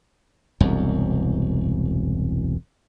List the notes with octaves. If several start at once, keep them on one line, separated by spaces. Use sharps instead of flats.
E1 C2 F#2